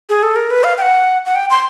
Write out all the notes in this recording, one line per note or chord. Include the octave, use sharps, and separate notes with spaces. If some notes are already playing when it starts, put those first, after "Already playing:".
G#4
A4
A#4
B4
F5
G5
F#5
F#5
G5
C6